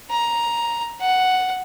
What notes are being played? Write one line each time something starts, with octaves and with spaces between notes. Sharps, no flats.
A#5
F#5